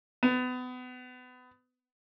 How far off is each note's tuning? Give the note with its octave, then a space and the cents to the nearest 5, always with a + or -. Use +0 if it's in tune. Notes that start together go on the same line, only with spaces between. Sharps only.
B3 +30